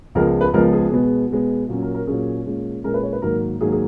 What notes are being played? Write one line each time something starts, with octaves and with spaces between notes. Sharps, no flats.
C#2 C#3 F3 G#3 B3 A#4
B4
C#2 C#3 F3 G#3 B3 A#4
G#4
B2 G#3 B3
B2 G#3 B3
A#2 F#3 C#4
A#4
A#4
A#2 F#3 C#4 G#4
A#2 G#3 C#4
A#2 G#3 C#4 A#4
B4
C#5
B4
G#2 D#3 F#3 A#3 A#4
G#2 D#3 F#3 A#3 G#4
G#4